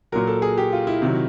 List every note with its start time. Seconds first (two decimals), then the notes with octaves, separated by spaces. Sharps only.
0.12 A#2 F#3 A#4
0.28 A4
0.42 G#4
0.57 G4
0.73 F4
0.87 E4
1.02 C3 D#3 F#3